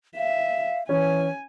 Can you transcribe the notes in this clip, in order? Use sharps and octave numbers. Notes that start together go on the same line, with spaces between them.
E5 F5
E3 C#4 G#5